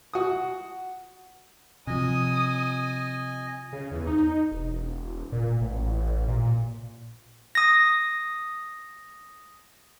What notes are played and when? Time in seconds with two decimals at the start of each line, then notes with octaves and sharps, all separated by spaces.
0.14 F#4 D#6
1.87 C3 F3 D#5 G#5 D#6
3.73 C#3
3.91 E2
4.07 D#4
4.51 E1
5.32 A#2
5.61 A1
6.28 A#2
7.55 D#6 A#6